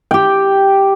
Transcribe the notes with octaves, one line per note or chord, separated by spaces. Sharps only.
G4 G5